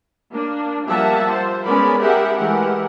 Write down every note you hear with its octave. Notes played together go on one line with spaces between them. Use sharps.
A#3 D4
F3 G3 A#3 E5 F#5 A5
C5
G#3 B3 C#4 A#4 D5 B5
G4 G#4 A#4 E5 F#5
E3 G#3 A3 G4 A#4 F#5